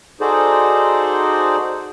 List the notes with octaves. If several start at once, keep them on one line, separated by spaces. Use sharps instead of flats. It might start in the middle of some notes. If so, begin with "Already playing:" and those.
D#4 F#4 G#4 A4 C5 D5